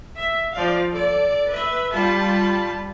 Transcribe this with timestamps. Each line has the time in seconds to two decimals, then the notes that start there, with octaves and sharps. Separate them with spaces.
0.16 E5
0.54 F3 D5 F5
0.91 A4 D5
1.52 B4 E5
1.93 G3 F4 A5 B5